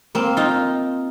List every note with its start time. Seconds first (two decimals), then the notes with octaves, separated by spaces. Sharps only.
0.15 A#3 C4
0.37 D#4 F4